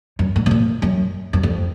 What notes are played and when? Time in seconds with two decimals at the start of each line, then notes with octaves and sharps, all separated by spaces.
0.19 F#2
0.36 G#2
0.46 B2
0.51 A#2
0.82 F#2
1.33 F#2
1.43 F2